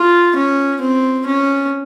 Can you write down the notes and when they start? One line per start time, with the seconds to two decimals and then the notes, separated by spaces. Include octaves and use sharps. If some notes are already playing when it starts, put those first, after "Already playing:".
Already playing: F4
0.36 C#4
0.81 C4
1.27 C#4